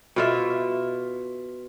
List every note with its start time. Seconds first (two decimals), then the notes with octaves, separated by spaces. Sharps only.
0.16 B2 F4 E5